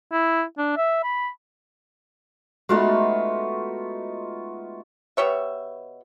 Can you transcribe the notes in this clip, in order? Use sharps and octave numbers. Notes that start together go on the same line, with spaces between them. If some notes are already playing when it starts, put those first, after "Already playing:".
E4
D4
E5
B5
G#3 A3 B3 D#4 F4 F#4
B2 G4 C#5 E5